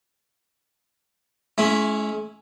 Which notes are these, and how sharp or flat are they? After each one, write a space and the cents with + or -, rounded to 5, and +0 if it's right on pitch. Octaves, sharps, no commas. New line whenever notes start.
G#3 +45 C#4 +0 E4 +0